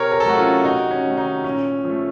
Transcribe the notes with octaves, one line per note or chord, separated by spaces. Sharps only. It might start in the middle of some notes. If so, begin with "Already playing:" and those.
Already playing: C3 A#4 C#5
A#4
A4
F#3 A3 F#4
C#4 F4
C3 D#4 F#4
C#4
D#3 A3
D#4
A#2 C#4
F3 A3